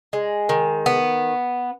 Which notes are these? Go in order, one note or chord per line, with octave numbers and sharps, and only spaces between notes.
G#3
D#3
B3